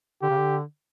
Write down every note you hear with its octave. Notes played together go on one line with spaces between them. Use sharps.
D3 G4
C#3
D3